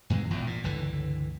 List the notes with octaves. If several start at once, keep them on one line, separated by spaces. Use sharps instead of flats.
G2 B2 E3 G#3
G#1 E2 A#2
A#2
G1 C#2 D3 E3